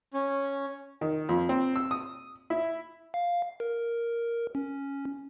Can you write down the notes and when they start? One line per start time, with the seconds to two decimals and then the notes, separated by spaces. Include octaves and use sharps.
0.14 C#4
1.01 D#3
1.29 F2
1.49 C4
1.76 E6
1.91 D#6
2.50 E4
3.14 F5
3.60 A#4
4.55 C#4